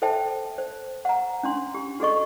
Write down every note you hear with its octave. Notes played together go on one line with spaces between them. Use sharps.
A4 C5 E5 G5 A5
C5
F#5 A#5
C#4 D4 C6
G4
F#4 G#4 A4 D#5 C#6